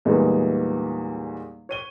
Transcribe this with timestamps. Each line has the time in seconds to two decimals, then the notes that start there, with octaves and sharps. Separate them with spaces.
0.05 E2 A#2 E3 G3 G#3 D#4
1.69 C#5 D#7 G7